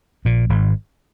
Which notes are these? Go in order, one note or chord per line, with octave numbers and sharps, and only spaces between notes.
A#1 A#2
G#1 G#2